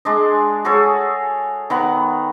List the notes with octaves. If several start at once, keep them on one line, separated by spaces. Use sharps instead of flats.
G#3 D4 D#5
F#4 G#4 A4 C#5
D#3 B3 F#5